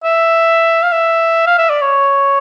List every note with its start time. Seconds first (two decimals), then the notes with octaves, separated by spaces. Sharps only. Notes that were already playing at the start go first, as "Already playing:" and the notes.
0.04 E5
0.83 F5
0.92 E5
1.47 F5
1.58 E5
1.70 D5
1.81 C#5